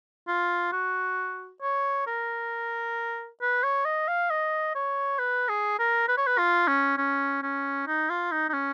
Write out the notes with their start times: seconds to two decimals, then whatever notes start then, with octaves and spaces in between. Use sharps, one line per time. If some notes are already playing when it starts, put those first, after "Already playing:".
0.28 F4
0.72 F#4
1.62 C#5
2.07 A#4
3.41 B4
3.63 C#5
3.85 D#5
4.08 F5
4.30 D#5
4.75 C#5
5.19 B4
5.49 G#4
5.79 A#4
6.08 B4
6.17 C#5
6.27 B4
6.38 F4
6.68 C#4
6.98 C#4
7.42 C#4
7.87 D#4
8.10 F4
8.32 D#4
8.49 D#4
8.53 C#4